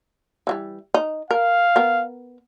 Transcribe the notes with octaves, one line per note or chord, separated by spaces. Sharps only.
E3 F#3 G3
D#4
A#4 F5
B3 A#4